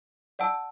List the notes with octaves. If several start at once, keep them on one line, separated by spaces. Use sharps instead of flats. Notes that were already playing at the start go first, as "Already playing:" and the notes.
D5 F#5 A5 E6